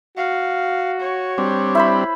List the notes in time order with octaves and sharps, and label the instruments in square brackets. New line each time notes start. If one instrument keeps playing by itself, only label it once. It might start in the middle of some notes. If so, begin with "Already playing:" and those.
[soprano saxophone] F#4 [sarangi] F5
[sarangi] C#5
[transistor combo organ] G3 C4 D4
[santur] E4 C5 B5